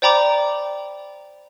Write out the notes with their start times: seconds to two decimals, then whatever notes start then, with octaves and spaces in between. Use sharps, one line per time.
0.02 C5 D5 G5 A#5 B5 D6